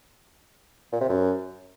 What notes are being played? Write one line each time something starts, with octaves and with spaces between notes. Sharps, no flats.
A#2
C3
F#2